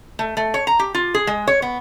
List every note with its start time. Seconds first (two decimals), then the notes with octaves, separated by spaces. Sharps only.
0.19 A3
0.37 A3
0.54 C#5
0.67 A#5
0.79 G4
0.94 F4
1.14 G#4
1.27 G#3
1.47 C#5
1.62 B3